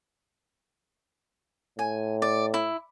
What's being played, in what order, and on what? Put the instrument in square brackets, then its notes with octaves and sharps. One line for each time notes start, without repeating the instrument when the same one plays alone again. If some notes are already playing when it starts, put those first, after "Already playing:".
[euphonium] A2 [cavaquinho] G#5
[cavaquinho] D5
E4